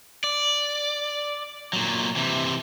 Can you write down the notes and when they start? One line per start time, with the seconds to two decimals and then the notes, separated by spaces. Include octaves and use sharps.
0.24 D5
1.73 A#2 F#3
2.16 C3 E3